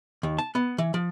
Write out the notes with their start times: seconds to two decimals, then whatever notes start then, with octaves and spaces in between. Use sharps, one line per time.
0.23 D#2
0.38 A5
0.55 B3
0.78 E3
0.94 F3